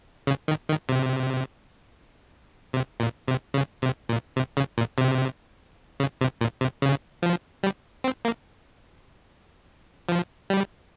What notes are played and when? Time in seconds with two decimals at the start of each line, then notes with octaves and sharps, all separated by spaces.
0.27 C#3
0.48 D#3
0.69 D#3
0.89 C3
2.73 C3
3.00 A#2
3.28 C3
3.54 C#3
3.82 C3
4.09 A#2
4.36 C3
4.57 C#3
4.78 A#2
4.98 C3
6.00 C#3
6.21 C3
6.41 A#2
6.61 C3
6.82 C#3
7.23 F3
7.63 G3
8.04 C4
8.25 A#3
10.09 F3
10.50 G3